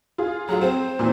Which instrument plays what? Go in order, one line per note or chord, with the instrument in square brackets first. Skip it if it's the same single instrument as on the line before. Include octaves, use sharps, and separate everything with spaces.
[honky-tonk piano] F4 G#4
[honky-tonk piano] F#3 A3 F4 [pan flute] G#4
[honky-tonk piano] C4 [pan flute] C5
[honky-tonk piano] A#2 E3 C4